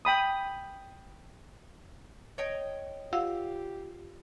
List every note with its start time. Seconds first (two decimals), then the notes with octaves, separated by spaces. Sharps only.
0.05 G5 B5 D#6
2.38 C#5 D#5 G5
3.13 F4 G4 F5 F#5 E6